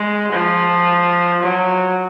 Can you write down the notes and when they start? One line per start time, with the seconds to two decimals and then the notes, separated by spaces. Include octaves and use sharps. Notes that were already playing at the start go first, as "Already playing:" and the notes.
Already playing: G#3
0.32 F3
1.43 F#3